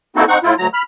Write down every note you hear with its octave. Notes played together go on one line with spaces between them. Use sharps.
A#3 C4 D#4 E4 F#4 A4
C4 D#4 F#5 C#6
A2 E4 F4
D2 F#3 A#5
B5 F6